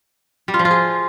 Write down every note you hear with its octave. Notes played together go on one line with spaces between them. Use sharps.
G3
F4
F3
F4
G#4